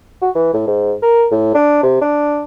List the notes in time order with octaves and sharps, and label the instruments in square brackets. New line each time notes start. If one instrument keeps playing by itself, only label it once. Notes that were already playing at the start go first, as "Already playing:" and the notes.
[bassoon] F#4
E3
A2
G#2
A#4
A2
D4
C3
D4